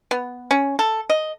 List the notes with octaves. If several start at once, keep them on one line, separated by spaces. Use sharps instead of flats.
B3
C#4
A4
D#5